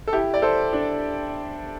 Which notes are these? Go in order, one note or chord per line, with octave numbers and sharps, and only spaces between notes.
A4
E4 G4
D5
A4 C5
D4